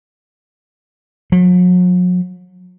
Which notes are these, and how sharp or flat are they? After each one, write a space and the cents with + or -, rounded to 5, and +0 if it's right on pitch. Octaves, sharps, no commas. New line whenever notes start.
F#3 -40